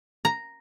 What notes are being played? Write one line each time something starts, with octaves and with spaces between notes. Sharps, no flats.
A#5